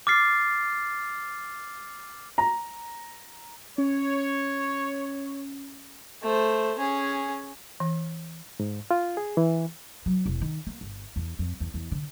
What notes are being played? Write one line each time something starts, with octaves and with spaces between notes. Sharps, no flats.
D6 F6 A6 C7
A#5
C#4 C#5
A3 C5
C#4 G#4
E3
G#2
F4
G#4
E3
F#3
E1
D#3
A#3
G1
E2
F2
E2
E2
D3